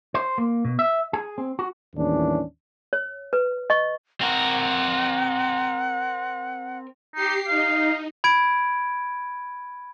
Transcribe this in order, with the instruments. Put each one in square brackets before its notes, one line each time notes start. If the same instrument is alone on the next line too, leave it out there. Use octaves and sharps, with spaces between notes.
[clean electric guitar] C5
A#3
B2
E5
G#4
C4
F#4
[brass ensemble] D#2 A2 E3 G3 C#4 D4
[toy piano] C#5
B4
D#5 C#6
[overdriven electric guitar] C4 A#4 [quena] F#5
[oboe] D#4 [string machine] G4 C7
[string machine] D#4 [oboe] F5
[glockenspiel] B5 G#6 D7